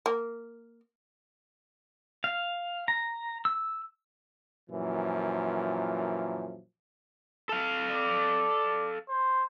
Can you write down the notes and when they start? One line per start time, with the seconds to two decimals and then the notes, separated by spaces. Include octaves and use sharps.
0.06 A#3
2.24 F5
2.88 A#5
3.45 E6
4.70 F#2 A#2 E3 F3
7.49 A4 F5
7.91 D5
9.09 C5